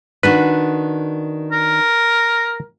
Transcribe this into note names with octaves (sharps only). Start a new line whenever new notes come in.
D#3 D4 F#4 B4
A#4